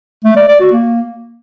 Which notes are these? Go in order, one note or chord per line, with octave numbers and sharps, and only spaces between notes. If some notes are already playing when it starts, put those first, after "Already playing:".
A3
D5
D5
F#4
A#3